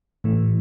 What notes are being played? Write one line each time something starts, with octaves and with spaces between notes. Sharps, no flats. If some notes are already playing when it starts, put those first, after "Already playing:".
A2 E3 A3